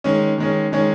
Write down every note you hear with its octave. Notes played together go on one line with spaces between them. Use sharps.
D#3 G#3 C#4
D#3 G#3 C#4
D#3 G#3 C#4